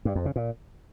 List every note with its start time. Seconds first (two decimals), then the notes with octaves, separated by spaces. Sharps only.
0.05 G2
0.15 F2
0.26 C#3
0.36 A#2